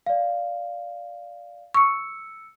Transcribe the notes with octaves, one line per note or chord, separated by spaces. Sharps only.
D5 F5
C#6 E6 C#7